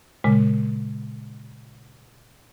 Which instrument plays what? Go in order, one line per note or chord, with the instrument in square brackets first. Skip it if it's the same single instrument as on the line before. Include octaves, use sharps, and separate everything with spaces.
[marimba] A#2 C#3 G#3